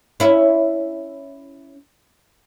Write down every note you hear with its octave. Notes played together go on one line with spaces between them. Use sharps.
C#4 E4